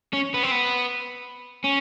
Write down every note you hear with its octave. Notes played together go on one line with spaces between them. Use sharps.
C#4
B3
C4
B3
C#4